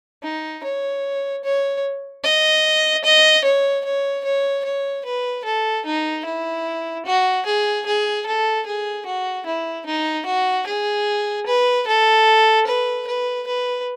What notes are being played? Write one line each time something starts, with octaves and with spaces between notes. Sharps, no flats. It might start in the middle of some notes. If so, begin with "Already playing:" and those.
D#4
C#5
C#5
D#5
D#5
C#5
C#5
C#5
C#5
B4
A4
D#4
E4
F#4
G#4
G#4
A4
G#4
F#4
E4
D#4
F#4
G#4
B4
A4
B4
B4
B4